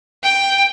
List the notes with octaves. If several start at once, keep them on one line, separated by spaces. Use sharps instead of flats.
G5